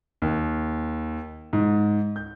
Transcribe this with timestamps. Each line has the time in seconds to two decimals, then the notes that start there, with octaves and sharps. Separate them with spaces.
0.22 D#2
1.53 G#2
2.16 G6